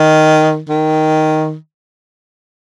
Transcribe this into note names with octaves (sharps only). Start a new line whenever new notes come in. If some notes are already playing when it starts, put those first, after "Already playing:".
Already playing: D#3
D#3